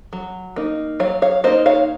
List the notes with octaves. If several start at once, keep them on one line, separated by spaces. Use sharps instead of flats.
F#3
A#3 D#4
F#3 C#5 F5
C#5 F5
A#3 D#4 C5 D#5
C#5 F5